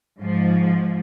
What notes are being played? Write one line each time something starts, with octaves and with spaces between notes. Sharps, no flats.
G#2 F3